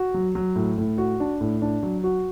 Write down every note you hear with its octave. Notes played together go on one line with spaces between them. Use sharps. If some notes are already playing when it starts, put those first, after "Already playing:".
Already playing: F#4
F#3
F#3
A2
A2
F#4
D4
A2
D4
F#3
F#4